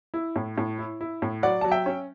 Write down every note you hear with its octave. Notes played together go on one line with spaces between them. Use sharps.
E4
A2
A2
E4
E4
A2
F#3 D5 F#5
F#3 A5
E5 G5
C#4